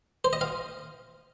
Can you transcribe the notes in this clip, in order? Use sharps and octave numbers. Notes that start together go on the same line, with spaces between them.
C5
D#5
F5